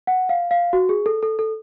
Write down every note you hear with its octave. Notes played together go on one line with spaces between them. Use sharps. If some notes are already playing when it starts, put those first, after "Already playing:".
F#5
F5
F5
F#4
G#4
A4
A4
A4